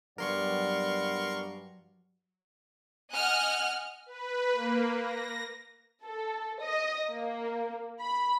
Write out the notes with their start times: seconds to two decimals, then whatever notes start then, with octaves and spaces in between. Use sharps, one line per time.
0.18 G2 F#3 B3 A#4 D5 F#5 C6 C#6
3.12 D#5 F#5 G#5 F6 F#6
4.06 B4
4.52 A#3
5.00 A#6
6.04 A4
6.61 D#5
7.10 A#3
8.02 B5